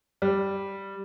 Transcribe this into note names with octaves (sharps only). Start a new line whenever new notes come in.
G3